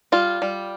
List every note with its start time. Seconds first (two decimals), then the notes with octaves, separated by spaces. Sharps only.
0.12 G3 F4
0.42 G3